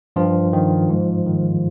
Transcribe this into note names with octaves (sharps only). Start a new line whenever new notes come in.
G2 F3 F4
D#3
G#2
D#3